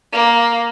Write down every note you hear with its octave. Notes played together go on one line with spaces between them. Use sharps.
A#3